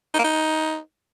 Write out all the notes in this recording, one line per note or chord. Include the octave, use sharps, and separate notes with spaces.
D#4
A#3
D#4